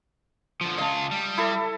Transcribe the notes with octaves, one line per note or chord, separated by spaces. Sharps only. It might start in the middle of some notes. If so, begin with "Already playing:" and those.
D3 F3
C#2 F4 D#5 A5
G3
E4 A4